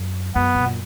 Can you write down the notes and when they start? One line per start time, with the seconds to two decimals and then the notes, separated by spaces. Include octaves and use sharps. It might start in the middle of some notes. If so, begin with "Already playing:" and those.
Already playing: F#2
0.35 F#2 B3
0.55 B2
0.66 A#2